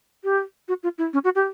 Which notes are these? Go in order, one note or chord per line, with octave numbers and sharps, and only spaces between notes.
G4
F#4
F4
E4
C#4
F#4
G4